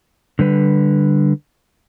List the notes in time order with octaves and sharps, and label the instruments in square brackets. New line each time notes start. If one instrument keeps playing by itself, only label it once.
[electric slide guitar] D3 G3 B4